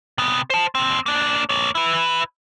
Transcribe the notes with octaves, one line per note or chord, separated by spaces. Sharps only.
C3 B3
C5 A5
D#2 C4
A#3 D4
A#3 C#5
E4 B4